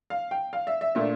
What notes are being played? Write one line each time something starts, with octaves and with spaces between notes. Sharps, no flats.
F5
G5
F5
E5
E5
A#2 A3 D4 E5